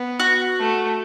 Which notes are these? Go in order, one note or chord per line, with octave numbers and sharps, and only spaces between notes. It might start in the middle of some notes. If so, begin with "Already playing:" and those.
Already playing: B3
F#4
A3